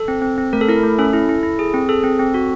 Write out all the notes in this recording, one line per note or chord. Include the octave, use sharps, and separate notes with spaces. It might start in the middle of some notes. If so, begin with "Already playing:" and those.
Already playing: A4
C4
C4
C4
A3 A#4
A4
E4 A#4
A3
C#4 A4
E4
E4
E4
G#4
C4
G#4 A4
C4
C4
F#4